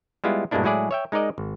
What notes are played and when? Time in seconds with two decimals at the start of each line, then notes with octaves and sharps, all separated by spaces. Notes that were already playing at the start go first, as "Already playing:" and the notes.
0.24 G3 G#3 B3 E4 F4
0.51 G2 B2 G#3 A#3 D4 E4
0.64 A2 F#3 G#3 E4 G#4 D5
0.91 C#5 E5 G5
1.12 G#3 D#4 A#4 D5 D#5
1.38 G#1